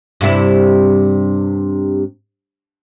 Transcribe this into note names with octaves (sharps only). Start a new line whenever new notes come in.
G2 C3 E4